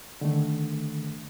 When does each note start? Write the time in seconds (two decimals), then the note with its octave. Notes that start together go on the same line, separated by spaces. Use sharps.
0.21 D3 D#3 A3